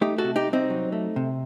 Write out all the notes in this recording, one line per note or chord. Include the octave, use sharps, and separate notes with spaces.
A3 D#4 G4
F#4 A4
C3
D#4 G4
C2
C4 D#4
F#3
A3
C3